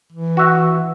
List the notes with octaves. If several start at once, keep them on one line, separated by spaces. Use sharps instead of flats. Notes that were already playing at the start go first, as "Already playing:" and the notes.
E3
F#4 E5